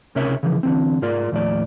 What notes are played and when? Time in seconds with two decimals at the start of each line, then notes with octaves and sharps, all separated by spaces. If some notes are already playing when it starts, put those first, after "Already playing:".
0.15 C#2 C3 C#4 A#4 C#5 E5
0.43 C#3 E3 F3
0.63 D3 E3 C4
1.02 G#2 F4 A#4 D5
1.32 D#2 A2 F3 D5